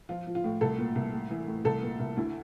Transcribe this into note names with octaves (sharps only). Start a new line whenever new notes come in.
F3 F4
F3
F4
A2
C2 A4
A#2
C2
A2
E3
A2
C2 A4
A#2
C2
D2 E4